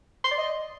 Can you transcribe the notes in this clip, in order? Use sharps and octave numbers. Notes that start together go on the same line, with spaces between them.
C6
D5
D#5